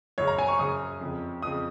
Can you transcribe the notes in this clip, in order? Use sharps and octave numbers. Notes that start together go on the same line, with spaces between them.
F#2 C#3 C#5
A#5
G#5
C#6
F#2 C#3 D#6
F2 C#3
F2 C#3 D#6